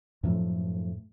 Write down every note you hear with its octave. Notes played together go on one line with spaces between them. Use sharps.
F#2 A2 F3 A3